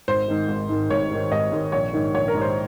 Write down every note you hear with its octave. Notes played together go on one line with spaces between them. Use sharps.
G#1 C5
G#2 D#3
G#1
G#2 D#3
G#1 C#5
G#2 D#3
G#1 D#5
G#2 D#3
A#1 C#5
G#2 D#3
A#1 C#5
A#4
G#2 D#3
C5